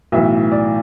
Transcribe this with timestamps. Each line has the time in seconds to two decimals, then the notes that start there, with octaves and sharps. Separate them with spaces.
0.12 B1 A2 E3 E5
0.52 D5